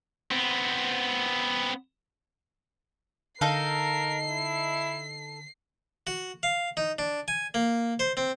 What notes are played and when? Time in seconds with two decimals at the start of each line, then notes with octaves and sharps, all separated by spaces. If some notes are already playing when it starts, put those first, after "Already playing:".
0.31 B3 C4
3.41 D3 D#4 A4 A#4 F5 C7
4.29 E4
6.07 F#4
6.43 F5
6.77 D#4
6.99 D4
7.28 G#5
7.54 A#3
8.00 C5
8.17 C4